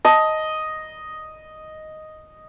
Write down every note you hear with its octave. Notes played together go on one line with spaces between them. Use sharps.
D#5 A5